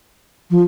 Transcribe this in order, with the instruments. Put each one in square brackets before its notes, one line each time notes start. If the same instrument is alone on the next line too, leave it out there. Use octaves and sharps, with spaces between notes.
[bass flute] F3